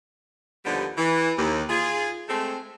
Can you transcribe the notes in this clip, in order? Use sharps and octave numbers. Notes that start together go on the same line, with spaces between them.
D#2 D3 F3 G3 B3 D#4
E3
D#2
F4 G#4
G#3 A3 C4